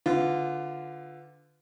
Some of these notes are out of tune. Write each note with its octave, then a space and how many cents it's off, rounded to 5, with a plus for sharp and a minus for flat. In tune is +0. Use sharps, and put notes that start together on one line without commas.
D3 +0 F4 +0 B4 +25